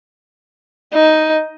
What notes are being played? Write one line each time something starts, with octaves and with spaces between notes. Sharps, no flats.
D#4